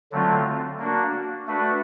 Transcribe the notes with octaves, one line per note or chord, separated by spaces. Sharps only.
D3 F#3 A3 C4 F4
A#3 D4 F#4
A3 D4 F#4 B4